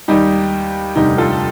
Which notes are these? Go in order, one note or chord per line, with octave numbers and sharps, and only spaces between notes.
D#2 D#3 G3 D#4 G4
F1 D#2 D3 G3 D#4 G4
F4 A4